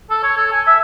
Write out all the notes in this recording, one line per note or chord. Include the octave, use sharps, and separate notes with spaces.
A4
C#5
A4
G#5
E5